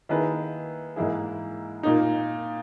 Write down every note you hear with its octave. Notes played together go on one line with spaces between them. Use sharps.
D#3 A#3 E4 G#4 B4
G#2 E3 A#3 E4 G#4
A#2 A#3 D#4